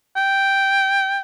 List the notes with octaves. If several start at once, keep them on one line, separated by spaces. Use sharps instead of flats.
G5